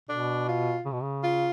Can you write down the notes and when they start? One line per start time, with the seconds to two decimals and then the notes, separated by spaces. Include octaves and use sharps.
0.09 B2 D4
0.48 F4
0.85 C#3
0.93 B2
1.02 C#3
1.23 F4